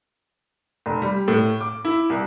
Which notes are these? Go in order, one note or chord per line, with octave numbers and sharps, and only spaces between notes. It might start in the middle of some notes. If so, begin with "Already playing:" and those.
F1
G3
A2
D6
E4
C2